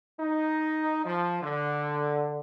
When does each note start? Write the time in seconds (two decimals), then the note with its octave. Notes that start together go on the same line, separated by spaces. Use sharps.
0.19 D#4
1.05 F3
1.42 D3